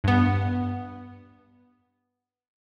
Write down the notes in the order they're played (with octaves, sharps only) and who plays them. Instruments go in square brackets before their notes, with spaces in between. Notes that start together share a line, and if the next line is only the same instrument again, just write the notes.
[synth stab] G2 B3